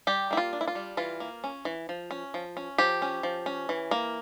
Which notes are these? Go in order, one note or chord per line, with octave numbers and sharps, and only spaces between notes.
G3 G4
A#3 E4
F4
D4
E4
F4
G3
E3 F4
A#3
C#4
E3
F3
C#4
F3
C#4
F3 G4
C#4
F3
C#4
E3
A#3